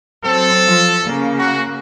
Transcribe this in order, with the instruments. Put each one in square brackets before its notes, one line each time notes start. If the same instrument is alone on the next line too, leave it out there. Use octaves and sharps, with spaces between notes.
[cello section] F#3 C4 [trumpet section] A4
[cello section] F3
C#3 A#3
[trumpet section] F#4